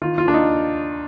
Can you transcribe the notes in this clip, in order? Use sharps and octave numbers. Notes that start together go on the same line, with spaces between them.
D#3 F4
F4
D#2 D4
D#4